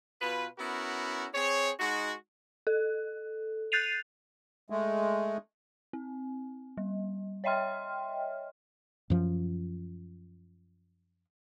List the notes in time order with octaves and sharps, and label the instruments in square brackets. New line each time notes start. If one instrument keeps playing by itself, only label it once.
[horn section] B2 F4 B4
B3 C#4 E4 F#4 A#4
C4 G#4 C#5
G#3 D#4 F#4
[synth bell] A4
F#6 G6 A6 C7 D#7 F7
[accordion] G#3 A3
[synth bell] C4
G3
C#5 D#5 E5 G5 C6 F6
[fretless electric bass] F#2 F3